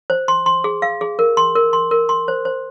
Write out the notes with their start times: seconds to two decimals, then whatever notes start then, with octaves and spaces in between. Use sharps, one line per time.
0.10 C5
0.28 C6
0.46 C6
0.64 G#4
0.82 F5
1.01 G#4
1.19 A#4
1.37 C6
1.55 A#4
1.73 C6
1.91 A#4
2.09 C6
2.28 C5
2.45 C5